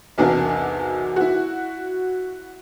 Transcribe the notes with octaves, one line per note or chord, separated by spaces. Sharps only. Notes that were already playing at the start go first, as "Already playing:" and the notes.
B1 E2 C3 D4 F#4 A#4
E4 F#4